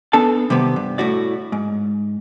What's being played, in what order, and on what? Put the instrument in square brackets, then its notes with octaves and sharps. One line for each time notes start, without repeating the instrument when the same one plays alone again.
[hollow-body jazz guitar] B3 D4 A4 A5
C3 D#3 G3 B3
G2
A2 E4 F#4 D5
G#2